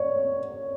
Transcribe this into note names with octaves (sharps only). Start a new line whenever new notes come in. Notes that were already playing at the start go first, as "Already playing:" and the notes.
Already playing: C#5 D5